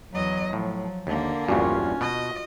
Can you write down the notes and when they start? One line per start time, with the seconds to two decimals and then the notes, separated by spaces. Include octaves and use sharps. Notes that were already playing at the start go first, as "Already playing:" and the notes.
0.13 E2 F#3 D#5
0.53 A2 F3 F#3
1.07 D#2 D3 A#3
1.48 A#1 E2 G2 C#4 F4 F#4
2.01 B2 D#5